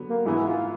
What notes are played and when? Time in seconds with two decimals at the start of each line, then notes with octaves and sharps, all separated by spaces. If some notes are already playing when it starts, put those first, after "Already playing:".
Already playing: D3 F#3 B3
0.09 A#3
0.25 G#2 E3 G#3 B3 E4
0.47 F4